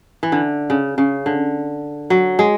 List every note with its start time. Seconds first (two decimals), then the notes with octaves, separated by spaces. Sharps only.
0.23 E3
0.32 D3
0.70 C#3
0.98 C#3
1.26 D3
2.10 F#3
2.39 G#3